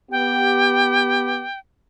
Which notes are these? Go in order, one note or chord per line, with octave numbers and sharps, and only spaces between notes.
B3 G4 G5